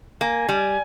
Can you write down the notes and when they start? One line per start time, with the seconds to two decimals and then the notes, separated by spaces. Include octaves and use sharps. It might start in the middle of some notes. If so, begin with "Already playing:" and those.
0.21 A#3 G#5
0.49 G3